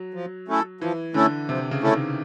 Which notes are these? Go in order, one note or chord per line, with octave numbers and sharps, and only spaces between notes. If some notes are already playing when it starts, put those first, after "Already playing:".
Already playing: F#3
F3
A3 C#4 E4 A4
E3 F3
D3 A3 C#4 E4 A4
C3 F3
C#3
A3 C#4 E4 A4
D#3